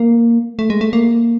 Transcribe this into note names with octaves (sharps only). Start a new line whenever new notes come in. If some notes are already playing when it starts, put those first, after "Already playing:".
Already playing: A#3
A3
G#3
A3
A#3